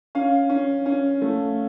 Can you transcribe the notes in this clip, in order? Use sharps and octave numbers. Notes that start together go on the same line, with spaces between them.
C#4 F5
C#4
C#4
A3